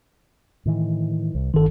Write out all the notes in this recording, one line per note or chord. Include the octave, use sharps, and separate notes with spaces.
A2 D#3 E3
C2
G1 D#3 A4